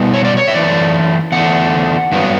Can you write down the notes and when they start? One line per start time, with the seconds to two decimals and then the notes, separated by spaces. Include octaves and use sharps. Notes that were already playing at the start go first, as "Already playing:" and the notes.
Already playing: B2 G3 B3
0.13 C#5
0.25 D5
0.37 C#5
0.48 E5
0.53 F#2 E3 A3 D5
1.32 E2 D3 A3 F#5
2.12 G2 F#3 B3